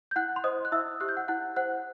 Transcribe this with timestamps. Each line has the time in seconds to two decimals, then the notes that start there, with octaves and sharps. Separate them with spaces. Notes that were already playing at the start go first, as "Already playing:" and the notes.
0.11 G6
0.16 E4 F#5 F#6
0.36 C6
0.44 C5 D#5 D#6
0.65 F#6
0.72 E4 E5 E6
1.00 G4 F#6
1.09 G6
1.17 F#5 F#6
1.28 E4 F#5 F#6
1.56 C5 F#5 F#6